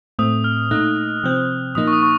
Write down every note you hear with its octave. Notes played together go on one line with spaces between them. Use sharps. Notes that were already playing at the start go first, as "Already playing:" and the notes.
A2 A3 C4 D#6
F6
A#2 A3 D#4 F#6
C3 F3 C4
A#2 F3 A#3 D#4 D#6
C#6
D#6
C#6